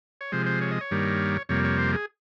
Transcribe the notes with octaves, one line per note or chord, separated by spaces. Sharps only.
C#5
C3 F3 G#3 C5
C5
C#5
D#5
C#5
G2 D#3 G3 A#3
F2 C3 G3 A#3 C#5
C#5
C5
G#4